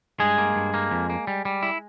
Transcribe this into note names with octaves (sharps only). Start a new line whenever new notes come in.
G2 G#3 G#4
A#3
G2
A#3
F2
A#3
G3
G3
E4